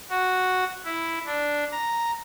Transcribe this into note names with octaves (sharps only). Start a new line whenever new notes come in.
F#4
E4
D4
A#5